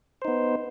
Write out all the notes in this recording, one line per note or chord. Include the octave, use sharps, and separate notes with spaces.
B3 D#4 C5